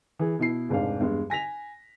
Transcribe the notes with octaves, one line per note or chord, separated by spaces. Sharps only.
E3 G#4
B2 E4 C7
F1 G#2 D4 F5
E2 G2 G#3
G#5 A#6 B6 F7